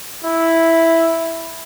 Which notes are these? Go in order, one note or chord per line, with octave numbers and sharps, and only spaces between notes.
E4